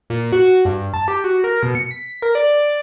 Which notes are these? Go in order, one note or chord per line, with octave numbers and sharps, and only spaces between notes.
A#2
F#4
G2
A5
G4
F#4
A#4
B2
C#7
B6
A#4
D5